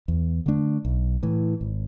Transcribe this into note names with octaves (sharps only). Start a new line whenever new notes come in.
E2
D3 A3 D4
B1
A2 E3
G#1